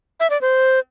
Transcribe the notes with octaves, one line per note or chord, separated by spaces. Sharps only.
E5
D5
C5